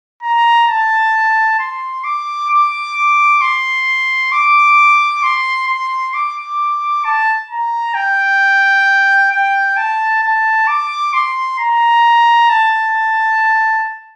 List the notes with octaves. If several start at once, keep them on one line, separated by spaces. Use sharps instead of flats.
A#5
A5
C6
D6
D6
C6
D6
C6
C6
D6
A5
A#5
G5
G5
A5
A5
D6
C6
A#5
A5